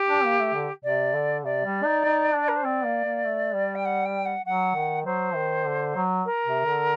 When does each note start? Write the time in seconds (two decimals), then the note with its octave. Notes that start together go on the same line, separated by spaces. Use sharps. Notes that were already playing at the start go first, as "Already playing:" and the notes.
Already playing: G4
0.09 D4
0.24 A#3
0.39 A3
0.54 D3
0.84 C3 D5
1.14 D3
1.44 C3 D5
1.64 G3
1.84 D#4
2.05 D#4
2.34 D4
2.48 A#4
2.56 C5
2.64 C4 D5
2.85 A#3
3.04 A#3
3.25 A3
3.55 G3
3.75 G5
3.85 F#5
4.05 G5
4.25 F#5
4.45 F#3 F#5
4.75 D#3
5.05 F#3 C5
5.35 D#3
5.65 D3
5.96 F#3
6.25 A#4
6.46 C3
6.65 D3